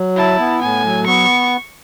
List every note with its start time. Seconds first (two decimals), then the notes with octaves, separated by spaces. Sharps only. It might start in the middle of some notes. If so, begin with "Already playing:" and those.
Already playing: F#3
0.16 E4 A5
0.39 B3
0.62 A2 G#5
0.85 F#3
1.07 B3 C#6